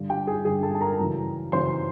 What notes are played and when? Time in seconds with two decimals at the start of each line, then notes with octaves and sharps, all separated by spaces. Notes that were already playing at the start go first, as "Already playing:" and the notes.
Already playing: G2 D3 G3
0.09 G4 G5
0.27 G#4 G#5
0.45 G2 D3 G3 G#4 G#5
0.63 A4 A5
0.75 A5
0.80 A#4 A#5
0.99 F#2 C#3 E3
1.52 F#2 C#3 E3 C5 C6